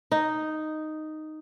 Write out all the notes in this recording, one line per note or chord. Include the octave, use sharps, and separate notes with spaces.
D#4